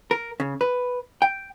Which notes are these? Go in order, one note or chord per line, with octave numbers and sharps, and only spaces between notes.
A#4
C#3
B4
G5